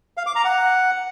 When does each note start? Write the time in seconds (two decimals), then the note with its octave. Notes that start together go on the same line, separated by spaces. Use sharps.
0.17 F5
0.26 D6
0.35 A#5
0.45 F#5